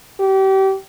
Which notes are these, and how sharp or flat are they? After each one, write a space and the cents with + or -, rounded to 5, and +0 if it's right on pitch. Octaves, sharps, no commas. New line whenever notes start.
G4 -30